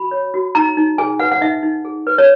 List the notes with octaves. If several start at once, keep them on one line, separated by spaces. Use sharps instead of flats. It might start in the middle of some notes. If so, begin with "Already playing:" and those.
Already playing: F#4 B5
C#5
F#4
D#4 A#5
D#4
G#4 G#5
B4 F#5
F#5
D#4 E5
D#4
G#4
B4
C#5